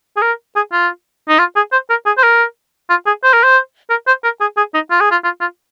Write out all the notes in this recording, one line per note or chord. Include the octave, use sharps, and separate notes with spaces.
G#4
A#4
G#4
F4
D#4
F4
G#4
C5
A#4
G#4
C5
A#4
F4
G#4
C5
A#4
C5
A#4
C5
A#4
G#4
G#4
D#4
F4
G#4
F4
F4
F4